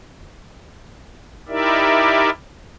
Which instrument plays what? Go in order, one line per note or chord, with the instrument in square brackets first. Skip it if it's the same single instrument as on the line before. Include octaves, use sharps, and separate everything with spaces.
[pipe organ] D#4 E4 G4 A#4 D5 E5